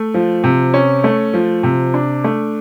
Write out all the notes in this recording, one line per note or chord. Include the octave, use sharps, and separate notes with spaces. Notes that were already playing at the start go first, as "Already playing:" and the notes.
Already playing: A3
F3
C3
C#4
A3
F3
C3
D4
A3